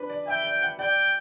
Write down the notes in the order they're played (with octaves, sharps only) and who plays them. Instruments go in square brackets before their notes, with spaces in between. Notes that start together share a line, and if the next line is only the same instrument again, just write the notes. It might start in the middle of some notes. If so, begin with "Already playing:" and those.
Already playing: [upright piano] D4 B4
D5
[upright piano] E5 [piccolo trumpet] G5
[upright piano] D5
F#5
[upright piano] D5 [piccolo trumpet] G5